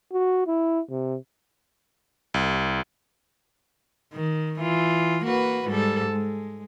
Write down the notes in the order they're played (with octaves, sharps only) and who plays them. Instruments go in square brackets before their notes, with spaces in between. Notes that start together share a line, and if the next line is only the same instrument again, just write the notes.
[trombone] F#4
E4
C3
[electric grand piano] C2
[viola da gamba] D#3
E3 F4
A#3 F#4 B4
G#2 G3 A4
G#3